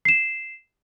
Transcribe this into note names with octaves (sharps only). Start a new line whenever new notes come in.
C7 E7